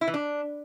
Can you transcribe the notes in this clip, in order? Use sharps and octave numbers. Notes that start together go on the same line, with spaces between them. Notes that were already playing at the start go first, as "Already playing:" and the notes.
E4
E3
D4